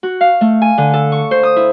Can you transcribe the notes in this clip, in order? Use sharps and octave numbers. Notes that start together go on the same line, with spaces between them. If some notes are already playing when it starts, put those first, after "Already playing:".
F#4
F5
A3
G#5
D3
A4
C#6
C5
D#6
E4